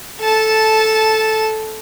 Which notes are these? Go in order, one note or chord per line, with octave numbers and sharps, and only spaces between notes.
A4 A5